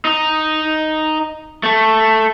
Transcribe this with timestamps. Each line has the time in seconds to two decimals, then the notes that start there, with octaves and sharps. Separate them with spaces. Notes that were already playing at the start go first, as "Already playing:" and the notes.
0.05 D#4
1.63 A3